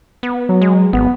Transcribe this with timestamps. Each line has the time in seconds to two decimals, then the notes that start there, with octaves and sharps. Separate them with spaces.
0.23 B3
0.49 F#3
0.61 G#3
0.93 G#1 B3